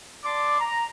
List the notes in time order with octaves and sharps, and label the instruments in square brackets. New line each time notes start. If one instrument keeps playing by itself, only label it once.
[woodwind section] D5 A5 C6 D6
A#5